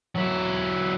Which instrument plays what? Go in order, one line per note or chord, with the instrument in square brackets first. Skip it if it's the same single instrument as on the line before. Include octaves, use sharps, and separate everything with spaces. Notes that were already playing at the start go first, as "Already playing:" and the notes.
[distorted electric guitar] F#3 E4